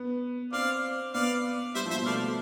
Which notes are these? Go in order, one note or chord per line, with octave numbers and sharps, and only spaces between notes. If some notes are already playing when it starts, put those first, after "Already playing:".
Already playing: B3
C4 D5 F5
B3 D5 F5
G3 C5 E5
F3
C5 E5
B2
A3 D5 F5
A3